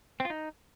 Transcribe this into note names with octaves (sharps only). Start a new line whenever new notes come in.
C4
F4
D#4